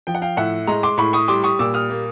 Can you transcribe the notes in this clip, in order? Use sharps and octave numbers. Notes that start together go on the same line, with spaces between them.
F3 G5
F#5
F5 G5
A2 E5 F#5
G#3 A#5 C6
C6 D6
A2 B5 C#6
C#6 D#6
G3 C6 D6
C#6 D#6
A#2 D6 E6
D#6 F6
A#3